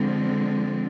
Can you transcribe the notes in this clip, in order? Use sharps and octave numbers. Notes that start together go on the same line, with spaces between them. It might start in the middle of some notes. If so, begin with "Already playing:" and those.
Already playing: D3 F3 G#3 C4